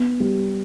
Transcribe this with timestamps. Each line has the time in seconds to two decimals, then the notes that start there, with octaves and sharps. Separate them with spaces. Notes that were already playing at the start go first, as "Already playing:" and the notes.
Already playing: B3
0.20 G3